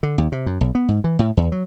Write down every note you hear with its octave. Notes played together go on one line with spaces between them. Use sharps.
D3
D#2
C3
F#2
B1
B3
G#2
E3
A2
E2
F#3